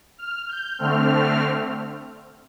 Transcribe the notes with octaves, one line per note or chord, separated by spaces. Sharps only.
F6
G6
D3 A3 C4 F6